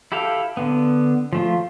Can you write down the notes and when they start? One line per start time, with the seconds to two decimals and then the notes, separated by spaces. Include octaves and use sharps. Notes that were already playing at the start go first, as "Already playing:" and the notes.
0.12 E4 G4 A4 F5
0.57 D3 B3
1.33 F3 A3 F4